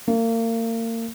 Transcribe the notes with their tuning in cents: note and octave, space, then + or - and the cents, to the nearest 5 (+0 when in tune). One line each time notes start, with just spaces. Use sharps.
A#3 -35